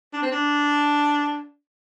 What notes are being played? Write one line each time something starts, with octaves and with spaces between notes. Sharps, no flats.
D4
C4
D4